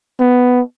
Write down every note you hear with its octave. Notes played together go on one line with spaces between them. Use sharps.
B3